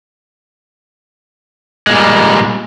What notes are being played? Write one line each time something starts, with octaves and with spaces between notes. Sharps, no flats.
A#2 G3 G#3